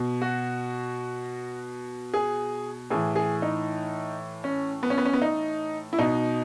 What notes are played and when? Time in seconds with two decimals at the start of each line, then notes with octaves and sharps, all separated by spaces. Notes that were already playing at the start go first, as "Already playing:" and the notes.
Already playing: B2
0.22 F#4
2.14 G#4
2.90 A2 E3 G#4
3.16 G#4
3.42 D#4
4.44 C#4
4.83 B3
4.90 C#4
4.98 B3
5.05 C#4
5.13 B3
5.22 D#4
5.93 E4
5.98 B2 D#4